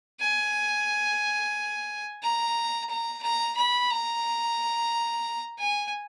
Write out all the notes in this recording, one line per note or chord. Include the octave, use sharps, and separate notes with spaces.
G#5
A#5
A#5
A#5
B5
A#5
G#5